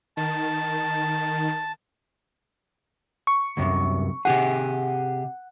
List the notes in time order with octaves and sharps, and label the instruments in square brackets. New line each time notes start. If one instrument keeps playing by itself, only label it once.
[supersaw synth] D#3 [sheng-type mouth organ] A5
[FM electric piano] C#6
[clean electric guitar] C2 F#2 C3
[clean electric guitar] C3 G4 G#4 [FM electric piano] F#5